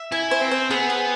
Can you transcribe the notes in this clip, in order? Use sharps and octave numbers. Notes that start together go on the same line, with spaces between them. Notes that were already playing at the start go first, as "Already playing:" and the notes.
Already playing: E5
E4 G#5
C5
C4
C5
B3 G#4
G#4